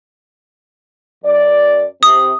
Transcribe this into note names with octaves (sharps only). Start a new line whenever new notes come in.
F#2 D5
C3 D#6